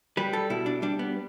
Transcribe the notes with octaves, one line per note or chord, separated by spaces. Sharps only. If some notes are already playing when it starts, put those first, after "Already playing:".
G3 B4
A4
B2 E4
D4
G3 D4
B3